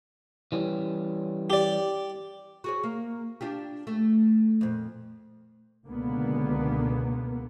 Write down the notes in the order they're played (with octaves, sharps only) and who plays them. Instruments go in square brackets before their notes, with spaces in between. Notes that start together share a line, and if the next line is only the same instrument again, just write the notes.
[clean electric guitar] E3 G3 C#4
[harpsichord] G4 D5
[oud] F#4 G#4 C#5
A#3
D4 F4 G4
A3
F2 A#2
[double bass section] C#2 B2 D3 A#3 B3